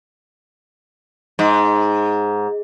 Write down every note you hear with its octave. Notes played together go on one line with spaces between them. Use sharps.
G#2